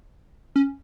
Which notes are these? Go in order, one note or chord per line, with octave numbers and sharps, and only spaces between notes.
C#4